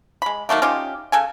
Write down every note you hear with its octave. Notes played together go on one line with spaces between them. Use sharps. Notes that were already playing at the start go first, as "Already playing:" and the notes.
G#3 B5
D#3 F#3 A3 A#3
C#4 D#4 F4 G4
C#3 A4 G#5